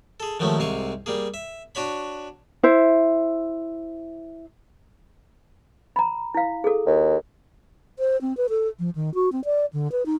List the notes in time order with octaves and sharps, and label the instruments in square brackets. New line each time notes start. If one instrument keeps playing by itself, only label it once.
[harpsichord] G#4 A4
D#3 F3 F#3 G#3 A3 C#4
C2 G#2 C3 F5 G#5 C#6
G3 A#3 G#4
E5
D4 F#4 C#5 B5
[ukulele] E4 C5 E5
[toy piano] A#5 B5
E4 F5
G#4 A4
[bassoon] D#2
[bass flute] C5
C4
B4
A4
F3
D#3
F#4
C4
D5
D3
B4
D#4